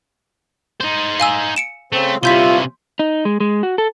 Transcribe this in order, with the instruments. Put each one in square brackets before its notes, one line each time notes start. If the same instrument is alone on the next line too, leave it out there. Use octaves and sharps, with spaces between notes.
[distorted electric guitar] D#4 C5
[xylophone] F5 G#5 E6
C#7 D7 E7
[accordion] C#3 C4 [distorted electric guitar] A3
[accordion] G2 E4 [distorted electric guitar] C3 C#4 [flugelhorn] F4 [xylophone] C6 G6 B6
[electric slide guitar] D#4
G#3
G#3
F#4
A4